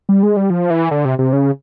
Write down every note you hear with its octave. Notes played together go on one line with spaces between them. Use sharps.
G3
G#3
G3
F3
E3
D3
C3
C3
C#3